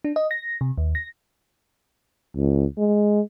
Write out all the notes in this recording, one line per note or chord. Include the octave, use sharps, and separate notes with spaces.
D4
D#5
A#6
C3
D#2
A#6
C#2
G#3